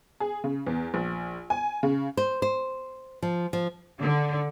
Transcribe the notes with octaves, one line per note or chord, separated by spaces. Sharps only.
G#4
C#3
E2
A#1
G#5
C#3
C5
C5
F3
F3
D3